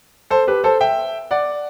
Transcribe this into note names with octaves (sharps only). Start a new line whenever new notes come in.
A4 C5
G4 B4
A4 C5
E5 G5
D5 F#5